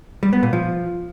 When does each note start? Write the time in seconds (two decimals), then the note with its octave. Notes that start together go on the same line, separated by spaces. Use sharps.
0.23 G3
0.33 B3
0.43 A#2
0.53 F3